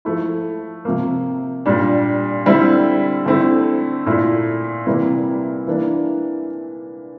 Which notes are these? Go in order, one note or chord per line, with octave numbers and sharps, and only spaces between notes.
F3 A3 E4
C3 F3 A#3
A#2 G3 D4
D3 G3 C4 E4
D3 A3 C4 E4
A#2 A3 E4
C3 E3 G3 A#3 E4
E3 A#3 D4